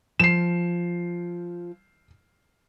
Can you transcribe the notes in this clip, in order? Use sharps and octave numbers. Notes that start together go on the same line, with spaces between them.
F3 C7 E7